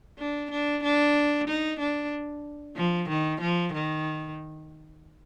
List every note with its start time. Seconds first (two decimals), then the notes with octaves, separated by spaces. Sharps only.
0.18 D4
0.51 D4
0.83 D4
1.47 D#4
1.79 D4
2.76 F3
3.09 D#3
3.41 F3
3.73 D#3